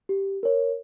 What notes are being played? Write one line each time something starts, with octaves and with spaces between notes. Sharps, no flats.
G4
A#4 C#5